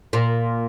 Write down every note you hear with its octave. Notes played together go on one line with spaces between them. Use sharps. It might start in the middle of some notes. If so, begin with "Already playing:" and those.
A#2